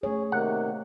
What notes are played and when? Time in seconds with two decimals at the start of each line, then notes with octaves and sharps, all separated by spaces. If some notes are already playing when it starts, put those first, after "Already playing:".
0.03 A3 G#4 C#5
0.32 C3 D#3 A#3 F#5